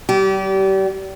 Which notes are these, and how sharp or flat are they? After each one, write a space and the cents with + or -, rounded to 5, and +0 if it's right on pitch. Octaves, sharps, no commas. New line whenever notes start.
G3 -35 G4 -25